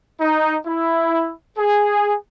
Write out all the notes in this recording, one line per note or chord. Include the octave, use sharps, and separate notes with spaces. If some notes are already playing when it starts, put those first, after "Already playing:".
D#4
E4
G#4